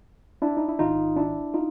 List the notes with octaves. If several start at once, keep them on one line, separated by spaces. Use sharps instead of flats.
D4 E4
D#4
E4
A1 G#2 D#3 D#4 F4
D4 E4
D#4 F4